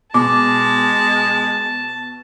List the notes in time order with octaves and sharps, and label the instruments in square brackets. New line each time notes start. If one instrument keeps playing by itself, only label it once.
[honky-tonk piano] B2 [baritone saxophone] G#3 [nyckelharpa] A5 [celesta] D6